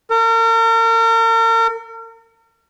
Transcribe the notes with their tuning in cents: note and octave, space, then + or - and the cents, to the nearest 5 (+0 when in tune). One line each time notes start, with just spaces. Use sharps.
A#4 -40